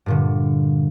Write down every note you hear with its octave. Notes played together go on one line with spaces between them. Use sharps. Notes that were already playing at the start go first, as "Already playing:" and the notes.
G2 A#2 D3